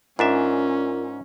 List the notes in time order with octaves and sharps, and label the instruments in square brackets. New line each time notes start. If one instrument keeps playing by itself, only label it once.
[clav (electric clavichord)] G#2 D4 E5 [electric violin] C#4 [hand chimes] F4 A#4 D5